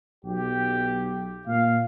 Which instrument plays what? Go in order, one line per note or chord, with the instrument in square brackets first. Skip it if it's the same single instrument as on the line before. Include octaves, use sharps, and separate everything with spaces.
[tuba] B1 [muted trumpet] G4
[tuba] A#2 [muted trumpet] F5